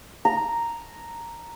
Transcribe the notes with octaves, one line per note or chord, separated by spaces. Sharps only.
A#5